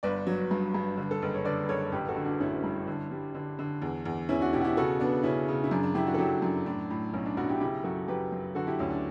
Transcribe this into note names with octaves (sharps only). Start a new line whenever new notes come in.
G1 B4 D5
F#3
G2
G2
D3
A4
F#1 B4
C#5
D3 B4 D5
F#1 A4 C#5
A1 G4 B4
F#4 A4
D3
D4 F#4
A1 C#4 E4
G2
D3
G3
D3
D3
E2
E2
E2 C#4 E4
D4 F#4
B2 E4 G4
F#4
E4 G4
C#3 F#4 A4
B3 D4
C#3 C#4 E4
C#3
E4
F#2 D4
D4
F#2 E4 G4
D4 F#4
A4
F#3 E4 G4
F#2 D4
A2 D4
A2
B1 C#4
D4
B1 D4 F#4
E4 G4
C#3 E4 G4
F#2 F#4 A4
F#2 G4 B4
F#2
D3 F#4 A4
E4 G4
D2 C#4
D4